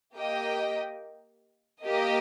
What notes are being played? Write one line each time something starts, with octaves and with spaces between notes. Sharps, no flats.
A#3 G4 D#5 G5
A#3 G4 D#5